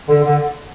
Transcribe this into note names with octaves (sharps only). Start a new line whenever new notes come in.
D3
D3